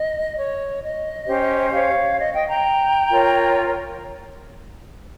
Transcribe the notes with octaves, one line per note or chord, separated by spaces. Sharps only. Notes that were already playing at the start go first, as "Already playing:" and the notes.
Already playing: D#5
C#5
D#5
C#4 G4 C5
C#5 F5
D#5
D#5 G5
G5 A#5
F4 A#4 C#5